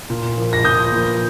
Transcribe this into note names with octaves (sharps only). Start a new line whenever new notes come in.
A#2
F3 A#3
A#6
A#2 D#6 G6
F3 A#3